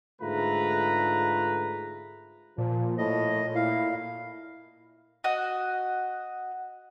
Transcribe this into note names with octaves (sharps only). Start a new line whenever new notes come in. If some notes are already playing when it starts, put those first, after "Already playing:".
G#2 D3 A3 F4 B4 A#5
A#2 F3
A2 D#5
E4 F5
F#4 D#5